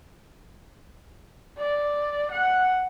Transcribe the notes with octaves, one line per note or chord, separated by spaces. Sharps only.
D5
F#5